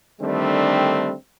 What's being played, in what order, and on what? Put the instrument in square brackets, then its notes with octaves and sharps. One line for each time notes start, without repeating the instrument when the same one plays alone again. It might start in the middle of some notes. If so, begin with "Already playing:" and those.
[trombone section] D3 D#3 G3 A3 C4 D4